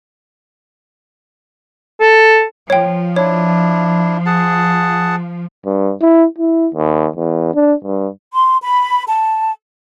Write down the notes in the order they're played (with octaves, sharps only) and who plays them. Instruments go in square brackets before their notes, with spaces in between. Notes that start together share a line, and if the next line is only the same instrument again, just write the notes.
[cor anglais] A4
[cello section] F3 [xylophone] C#5 G5
[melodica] D4 E4 [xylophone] C#5
[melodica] G#4 F#5 A5
[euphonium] G2
E4
E4
D#2
E2
D4
G2
[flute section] C6
B5
A5